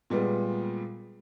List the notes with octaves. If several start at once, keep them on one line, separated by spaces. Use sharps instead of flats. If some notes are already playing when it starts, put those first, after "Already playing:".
A#2 G3 G#3 B3